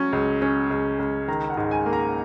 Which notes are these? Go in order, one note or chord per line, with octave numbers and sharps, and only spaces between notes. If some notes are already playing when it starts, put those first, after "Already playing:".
Already playing: F#3 C#4
C#2
C#4
C#2
C#2
D#3 A#5
F#5
G#2
G#5
A#3
A#5